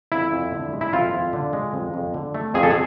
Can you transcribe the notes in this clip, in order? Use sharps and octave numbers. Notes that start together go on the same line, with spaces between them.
F2 E4
F2
D3
G#3
E4
F2 F4
F2
D3
G#3
F2
F2
D3
A3
F2 G#4
A4
G#4